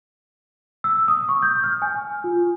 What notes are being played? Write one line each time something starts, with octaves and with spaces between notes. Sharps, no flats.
E6
D#6
C#6
G6
F6
G#5
F4